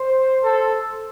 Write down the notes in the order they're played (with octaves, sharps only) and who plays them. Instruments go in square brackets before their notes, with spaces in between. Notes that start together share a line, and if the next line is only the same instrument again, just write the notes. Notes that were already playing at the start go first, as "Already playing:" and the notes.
Already playing: [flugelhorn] C5
[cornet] A4